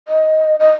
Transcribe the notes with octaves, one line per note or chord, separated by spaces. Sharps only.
D#5
D#5